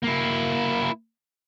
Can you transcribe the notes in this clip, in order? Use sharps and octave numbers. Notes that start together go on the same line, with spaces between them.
A#3 E4